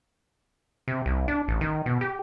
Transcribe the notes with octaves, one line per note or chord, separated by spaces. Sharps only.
C3
C2
D4
A1
D#3
B2
G4